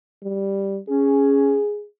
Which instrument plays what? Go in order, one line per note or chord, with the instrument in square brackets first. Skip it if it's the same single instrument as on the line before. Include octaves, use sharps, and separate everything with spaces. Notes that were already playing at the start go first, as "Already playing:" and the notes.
[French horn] G3
[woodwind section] C#4 [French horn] G#4